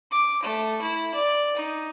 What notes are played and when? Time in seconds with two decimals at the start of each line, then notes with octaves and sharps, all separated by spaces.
0.11 D6
0.43 A3
0.82 E4
1.14 D5
1.57 D#4